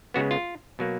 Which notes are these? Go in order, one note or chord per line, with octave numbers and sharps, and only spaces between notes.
C#3 G#3 B3 F#4
F4
B2 F#3 A#3